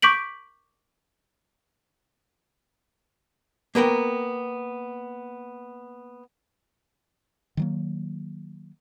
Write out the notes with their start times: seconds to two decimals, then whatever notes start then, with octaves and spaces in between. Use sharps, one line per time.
0.02 C#6 D6 G6 B6 D7 F#7
3.75 A#3 B3 A#4 G5
7.57 D#3 F#3 A#3